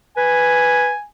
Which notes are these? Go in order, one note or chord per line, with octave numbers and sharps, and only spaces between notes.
B4 G#5